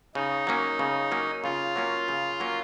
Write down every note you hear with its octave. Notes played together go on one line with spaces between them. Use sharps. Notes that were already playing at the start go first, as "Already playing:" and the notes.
C#3 D#4
F#3 A#3 C#4
C#3
F#3 A#3 C#4
C#3 F4
F#3 A#3 C#4
C#3
F#3 A#3 C#4